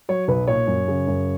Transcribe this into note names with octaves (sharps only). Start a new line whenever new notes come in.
F#3 C#5
B1 B4
A#2 C#5
F#2
C#3
F#2